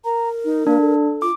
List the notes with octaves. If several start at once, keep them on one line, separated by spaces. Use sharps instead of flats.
A#4 A#5
D#4
A#3 D4
A4
F4 D6